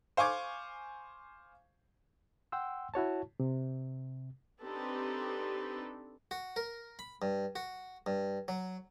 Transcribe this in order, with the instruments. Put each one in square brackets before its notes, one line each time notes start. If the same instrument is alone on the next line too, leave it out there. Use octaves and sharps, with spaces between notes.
[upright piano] C5 F5 G#5 C#6 D6 G#6
[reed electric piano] F#5 G5 C6 E6
E4 F#4 C#5 A5
C3
[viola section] C4 D4 D#4 G4 A4 B4
[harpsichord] F#4
A#4
B5
G2
F#4
G2
F#3